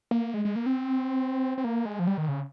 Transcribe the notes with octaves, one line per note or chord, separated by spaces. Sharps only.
A#3
G#3
G#3
A#3
C4
C4
A#3
G#3
F3
G3
D#3
C#3